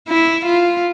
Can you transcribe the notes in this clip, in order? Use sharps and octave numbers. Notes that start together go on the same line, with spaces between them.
E4
F4